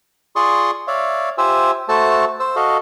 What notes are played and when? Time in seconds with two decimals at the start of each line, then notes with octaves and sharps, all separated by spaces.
0.36 F4 G#4 D5 C6 C#6 D#6
0.88 C#5 D5 E5 F5
1.38 F4 G4 C5 E5 G#5 E6
1.89 A3 F#4 A4 C5 A5 E6
2.40 C5 E6
2.56 F#4 A4 D#5 F5